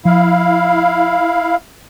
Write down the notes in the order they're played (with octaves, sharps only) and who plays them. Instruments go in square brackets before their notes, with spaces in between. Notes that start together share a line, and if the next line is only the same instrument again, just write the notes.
[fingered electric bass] F3 [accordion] E4 F5